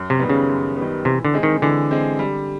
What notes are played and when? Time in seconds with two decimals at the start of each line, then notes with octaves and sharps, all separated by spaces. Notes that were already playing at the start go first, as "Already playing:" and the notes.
Already playing: F#2
0.10 C3
0.19 D#3 G3 B3
0.29 C#3
0.48 F#2
0.77 D#3 G3 B3
1.05 C3 E3
1.25 D3
1.34 G#3 C4
1.43 D#3
1.62 D3 E3
1.91 G#3 C4
2.19 G3